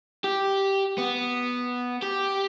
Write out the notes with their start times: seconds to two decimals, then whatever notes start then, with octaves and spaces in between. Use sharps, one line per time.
0.24 G4
0.98 B3
2.02 G4